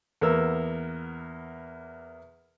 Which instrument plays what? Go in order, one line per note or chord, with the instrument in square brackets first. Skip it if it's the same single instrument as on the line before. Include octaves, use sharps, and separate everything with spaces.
[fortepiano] E2 A#3 B3 A#4 E6